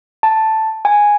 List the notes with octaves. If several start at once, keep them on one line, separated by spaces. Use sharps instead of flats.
A5
G#5